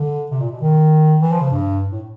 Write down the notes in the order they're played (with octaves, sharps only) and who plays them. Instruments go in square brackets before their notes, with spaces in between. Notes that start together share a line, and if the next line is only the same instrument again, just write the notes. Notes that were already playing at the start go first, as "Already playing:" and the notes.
Already playing: [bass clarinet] D3
C3
A#2
B2
D#3
E3
F3
C#3
G2
A2